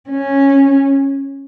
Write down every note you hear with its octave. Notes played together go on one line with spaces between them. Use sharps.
C#4